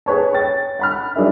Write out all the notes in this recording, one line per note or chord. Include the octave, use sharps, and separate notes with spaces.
G#4 B4 C#5 A5
C#5 G5 A6
F#5 B5 F6
F#3 D4 D#4 G#4 A#4 E5